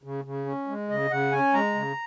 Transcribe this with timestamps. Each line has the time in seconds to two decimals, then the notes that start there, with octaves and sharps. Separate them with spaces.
0.03 C#3
0.25 C#3
0.46 C#4
0.67 G#3
0.89 C#3 D#5
1.11 C#3 F#5
1.32 C#4 G#5
1.54 G#3 A#5
1.74 C#3